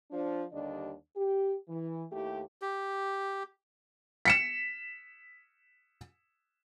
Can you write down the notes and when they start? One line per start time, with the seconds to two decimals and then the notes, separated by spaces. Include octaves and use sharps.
0.11 F3 D4
0.52 D#2 D3 G3 D4 D5 D#5
1.16 G4
1.69 E3
2.11 D#2 A3 E4 G4
2.62 G4
4.25 B6 C#7 E7